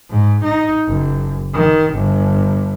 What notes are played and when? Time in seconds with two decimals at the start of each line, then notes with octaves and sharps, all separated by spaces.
0.10 G#2
0.44 D#4
0.89 F#1
1.54 D#3
1.94 G1